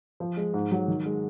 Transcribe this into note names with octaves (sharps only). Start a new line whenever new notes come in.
F3
G#3
G#2
F#3
D#3
G#3